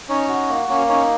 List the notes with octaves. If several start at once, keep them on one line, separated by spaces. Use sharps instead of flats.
C#4 D#4 C#5
F#4
A#3
A#3 C#4 C#5
C#4 D#4 C#5